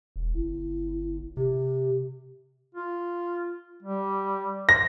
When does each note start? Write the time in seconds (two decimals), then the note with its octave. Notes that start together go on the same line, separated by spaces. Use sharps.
0.16 E1
0.34 G1 E4
1.37 C3 G4
2.75 F4
3.83 G3
4.69 C5 A#6